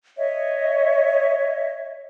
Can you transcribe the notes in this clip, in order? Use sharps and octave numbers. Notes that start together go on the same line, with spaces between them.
C#5 D#5 E5